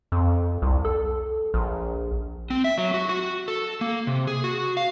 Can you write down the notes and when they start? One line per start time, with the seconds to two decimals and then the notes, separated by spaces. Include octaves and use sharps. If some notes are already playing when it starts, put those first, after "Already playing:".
0.12 F2
0.62 C2
0.85 A4
1.54 A#1
2.50 C4
2.64 E5
2.78 F#3
2.94 F#4
3.09 F#4
3.48 A4
3.81 A#3
4.07 C3
4.27 G#4
4.44 F#4
4.77 F5